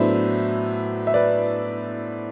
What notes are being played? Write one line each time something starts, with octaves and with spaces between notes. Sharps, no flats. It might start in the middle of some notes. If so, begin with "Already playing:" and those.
Already playing: A2 F#3 B3 D4 C5 E5
E5
B4 D5